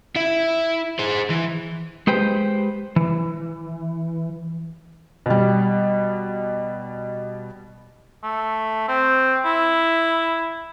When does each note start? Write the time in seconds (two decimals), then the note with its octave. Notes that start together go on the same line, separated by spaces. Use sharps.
0.16 E4 E5
0.99 G#4 C5
1.30 E3
2.07 G#3 G4 B4 C5 G5
2.96 E3
5.26 B2 G3
8.24 A3
8.88 C4
9.45 E4